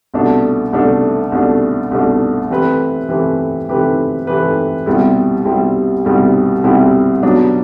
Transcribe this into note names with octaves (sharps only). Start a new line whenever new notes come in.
C2 B2 A3 D4
C2 B2 A3 D4
C2 B2 A3 D4
C2 B2 A3 D4
E3 A3 C4 G4 B4
E3 A3 C4 G4 B4
E3 A3 C4 G4 B4
E3 A3 C4 G4 B4
C2 B2 G3 C4 E4
C2 B2 G3 C4 E4
C2 B2 G3 C4 E4
C2 B2 G3 C4 E4
B2 F#3 B3 D4